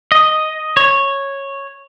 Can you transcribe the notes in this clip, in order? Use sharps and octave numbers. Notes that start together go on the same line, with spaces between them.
D#5
C#5